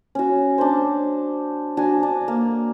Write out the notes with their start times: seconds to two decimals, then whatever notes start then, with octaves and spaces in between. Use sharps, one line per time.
0.15 C#4 F#4
0.58 D4 C5
1.77 D4 F#4 G#5
2.03 D4
2.28 A#3